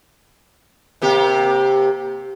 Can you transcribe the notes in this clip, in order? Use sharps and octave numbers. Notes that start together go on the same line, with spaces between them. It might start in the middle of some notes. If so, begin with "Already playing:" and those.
C3 A#3 G4